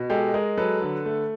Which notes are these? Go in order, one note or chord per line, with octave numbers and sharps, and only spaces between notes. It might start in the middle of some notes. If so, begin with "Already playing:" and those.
Already playing: B2
G#3 G4 A4
G#3 G#4 A#4
F#3 A4 B4
D3
A3